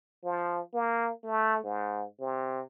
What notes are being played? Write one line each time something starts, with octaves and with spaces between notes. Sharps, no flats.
F3
A#3
A3
G#2
C3